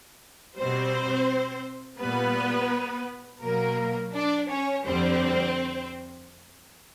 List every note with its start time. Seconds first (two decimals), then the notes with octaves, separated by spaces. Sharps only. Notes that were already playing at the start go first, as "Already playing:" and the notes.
0.57 B2 G3 C4 C5
2.00 A#2 G3 B3 B4
3.42 B2 F#3 A#3 A#4
4.13 D4 D5
4.49 C#4 C#5
4.85 F2 D3 G3 C4 C5